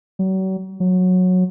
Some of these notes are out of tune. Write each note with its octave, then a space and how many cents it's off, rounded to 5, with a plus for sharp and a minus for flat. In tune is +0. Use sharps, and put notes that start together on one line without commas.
F#3 +40
F#3 -15